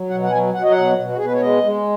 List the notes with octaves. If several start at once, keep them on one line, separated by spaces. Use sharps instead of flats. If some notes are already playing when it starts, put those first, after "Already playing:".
Already playing: F#3
B2 F#5
F#5
F#3 G#5
F#3 F#5
D#5
B2 F#5
B2
F#4
B2 G#4
B4
C#5
G#3 D#5
G#3